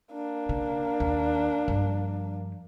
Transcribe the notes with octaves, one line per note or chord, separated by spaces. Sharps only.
A#3 D4
C#3
D#2
G2 F3